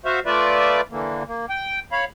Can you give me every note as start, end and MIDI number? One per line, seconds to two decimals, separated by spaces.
0.05 0.20 66
0.05 0.20 72
0.05 0.20 76
0.05 0.20 77
0.26 0.81 57
0.26 0.81 65
0.26 0.81 71
0.26 0.81 74
0.26 0.81 76
0.91 1.23 50
0.91 1.23 52
0.91 1.23 58
1.27 1.46 58
1.50 1.80 79
1.92 2.05 73
1.92 2.05 77
1.92 2.05 83